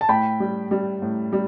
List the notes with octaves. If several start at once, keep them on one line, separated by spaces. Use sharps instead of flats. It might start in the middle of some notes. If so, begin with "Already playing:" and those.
A5
A2 G5 B5
G3
G3
A2
G3